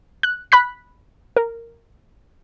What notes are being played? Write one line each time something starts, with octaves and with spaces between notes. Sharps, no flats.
F#6
B5 F#6 B6
A#4